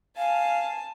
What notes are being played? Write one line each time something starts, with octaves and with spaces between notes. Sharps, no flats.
F5 G#5 A5